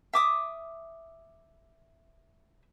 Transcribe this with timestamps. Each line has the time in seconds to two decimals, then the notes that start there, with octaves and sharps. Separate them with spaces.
0.13 E5 D6 D#6